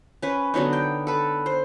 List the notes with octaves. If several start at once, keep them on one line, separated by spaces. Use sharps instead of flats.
C#4 B4
D3 F#3 B3 D#4
G5
A4 B4
C5